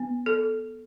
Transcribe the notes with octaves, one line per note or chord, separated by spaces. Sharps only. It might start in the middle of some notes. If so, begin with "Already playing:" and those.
Already playing: B3
A4